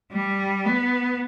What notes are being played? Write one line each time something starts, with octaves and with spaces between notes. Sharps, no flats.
G3
B3